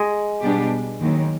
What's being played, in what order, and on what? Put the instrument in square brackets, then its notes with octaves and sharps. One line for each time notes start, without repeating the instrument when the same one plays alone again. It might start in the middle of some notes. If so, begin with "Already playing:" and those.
Already playing: [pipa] G#3
[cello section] B2 G3 B3 D4 G4
D#2 D#3 F#3